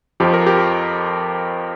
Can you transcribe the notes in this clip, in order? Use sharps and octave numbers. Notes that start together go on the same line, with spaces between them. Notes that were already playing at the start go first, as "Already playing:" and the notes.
F2 F3 G4
A#4
G4